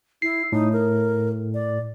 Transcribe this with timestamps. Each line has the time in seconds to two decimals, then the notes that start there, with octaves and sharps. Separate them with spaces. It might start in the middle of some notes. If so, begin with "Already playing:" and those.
0.22 E4 C7
0.52 A2 D#4
0.73 A#4
1.54 D5